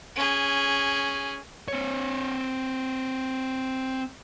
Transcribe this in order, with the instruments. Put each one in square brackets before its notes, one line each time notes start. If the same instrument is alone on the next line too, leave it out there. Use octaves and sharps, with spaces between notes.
[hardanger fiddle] C#4 G#4
[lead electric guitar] C4 C#5